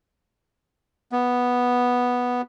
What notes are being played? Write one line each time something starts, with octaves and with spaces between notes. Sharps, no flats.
B3